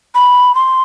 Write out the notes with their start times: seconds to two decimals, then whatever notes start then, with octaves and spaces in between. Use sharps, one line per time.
0.15 B5
0.55 C6